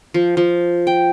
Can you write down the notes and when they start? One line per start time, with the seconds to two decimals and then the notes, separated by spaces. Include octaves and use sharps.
0.14 F3
0.37 F3
0.87 G5